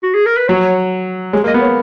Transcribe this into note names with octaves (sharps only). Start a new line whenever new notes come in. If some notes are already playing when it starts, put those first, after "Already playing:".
F#4
G#4
A#4
B4
F#3 C#5
G#3 C#5
A#3
D#5
B3
C#5